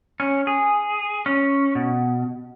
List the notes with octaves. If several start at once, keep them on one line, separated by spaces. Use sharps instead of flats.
C#4
G#4
C#4
B2